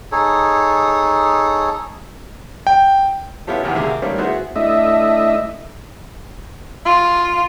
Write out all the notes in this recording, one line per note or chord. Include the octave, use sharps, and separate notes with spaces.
D#4 G#4 A4 C#5
G5
B3 C#4 E4 F4 G4 A4
B1 E2 C3 D#3 E3 A#3
D2 C3 A#3 G#4 E5
D6
D#3 G3 A3 A#3 C4 C#4
B3 E4 F#4 G#4 C5 E5
A3 D4 E4 D#5 E5
F4